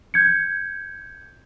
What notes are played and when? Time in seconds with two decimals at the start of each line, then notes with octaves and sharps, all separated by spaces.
0.14 G6 G#6 C#7